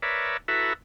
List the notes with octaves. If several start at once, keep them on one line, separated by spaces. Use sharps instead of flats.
A#4 B4 C#5 D5 E5
E4 F#4 A4 B4 E5 A#5